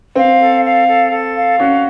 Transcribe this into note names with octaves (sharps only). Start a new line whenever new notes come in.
C4 F5
A4
F5
A4
A4
F5
C#4 F#4